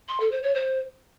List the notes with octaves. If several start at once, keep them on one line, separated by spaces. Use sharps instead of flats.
C6
A4
C5
C#5
C5